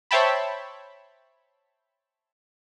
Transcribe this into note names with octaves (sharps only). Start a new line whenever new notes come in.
C5 C#5 E5 G5 A5 B5